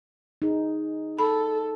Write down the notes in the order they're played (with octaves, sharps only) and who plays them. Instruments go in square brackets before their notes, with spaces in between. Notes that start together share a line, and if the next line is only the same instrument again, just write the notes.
[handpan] D#4 G#4
[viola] A4 [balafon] B5